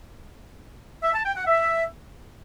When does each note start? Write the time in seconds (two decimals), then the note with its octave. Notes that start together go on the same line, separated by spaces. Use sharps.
1.03 E5
1.14 A5
1.25 G5
1.36 F#5
1.47 E5